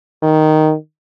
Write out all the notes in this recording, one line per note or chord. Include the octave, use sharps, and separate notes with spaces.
D#3